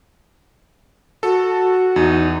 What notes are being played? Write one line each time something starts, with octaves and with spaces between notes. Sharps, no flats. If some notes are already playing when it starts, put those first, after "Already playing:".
F#4 A4
E2 D#4